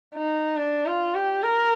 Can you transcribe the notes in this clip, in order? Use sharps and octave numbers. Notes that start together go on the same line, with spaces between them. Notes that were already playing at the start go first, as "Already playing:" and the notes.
D#4
D4
F4
G4
A#4